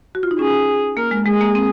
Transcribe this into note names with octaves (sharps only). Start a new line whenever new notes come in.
F#4
F4
D#4
C#4 G#4
A#3 A#4
G#3
G#3 G#4
A#3
C4